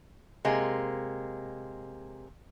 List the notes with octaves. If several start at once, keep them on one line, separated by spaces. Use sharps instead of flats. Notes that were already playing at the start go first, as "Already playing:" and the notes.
C3 G#3 A#3